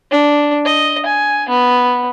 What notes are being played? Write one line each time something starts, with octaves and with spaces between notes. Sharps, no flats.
D4
D#5
G#5
B3